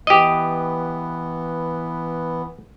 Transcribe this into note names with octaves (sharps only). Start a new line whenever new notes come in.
E3 B3 G4 D#5